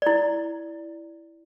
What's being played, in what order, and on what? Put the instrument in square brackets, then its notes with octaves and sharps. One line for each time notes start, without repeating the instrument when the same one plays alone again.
[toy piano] E4 D5